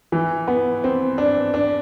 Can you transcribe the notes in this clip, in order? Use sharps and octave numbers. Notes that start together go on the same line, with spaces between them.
E3
B3
C4
D4
D4